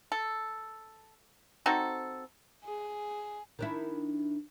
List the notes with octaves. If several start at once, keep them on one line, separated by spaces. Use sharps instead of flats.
A4
C4 D#4 F#4 A4
G#4
D#3 D4 E4